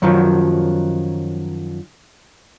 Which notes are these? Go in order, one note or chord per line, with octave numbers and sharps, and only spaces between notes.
F#2 D#3 F3 F#3